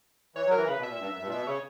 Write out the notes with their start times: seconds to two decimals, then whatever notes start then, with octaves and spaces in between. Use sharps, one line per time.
0.35 E3 C#5
0.47 F#3
0.51 A#4
0.57 E3
0.68 C#3 B4
0.79 B2
0.83 E5
0.89 A#2
0.99 G2
1.10 F#2
1.20 G2
1.26 A#2
1.31 B2 E5
1.47 C#3 C#5